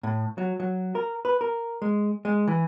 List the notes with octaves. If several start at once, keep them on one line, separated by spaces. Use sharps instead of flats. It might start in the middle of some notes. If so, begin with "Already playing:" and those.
A2
F#3
F#3
A#4
B4
A#4
G#3
G#3
E3